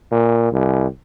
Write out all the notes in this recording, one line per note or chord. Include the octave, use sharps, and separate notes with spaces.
A#2
C2